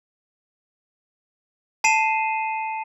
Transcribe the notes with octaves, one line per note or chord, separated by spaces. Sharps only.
A5 C7 D#7 E7